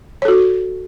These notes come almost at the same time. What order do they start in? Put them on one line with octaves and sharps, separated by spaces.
C#5 A4 F#4